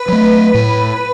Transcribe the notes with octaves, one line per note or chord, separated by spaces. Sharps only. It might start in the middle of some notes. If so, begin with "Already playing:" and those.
Already playing: B4
F#3 A3
A2